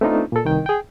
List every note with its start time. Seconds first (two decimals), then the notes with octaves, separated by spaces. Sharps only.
0.01 A3 B3 C4 D4 D#4 F4
0.32 A#2 A4
0.45 C2 D#3 G5
0.66 G#4 G5